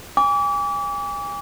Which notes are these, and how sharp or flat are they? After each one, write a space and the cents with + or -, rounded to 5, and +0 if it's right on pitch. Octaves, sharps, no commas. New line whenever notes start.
G#5 -35 D6 -35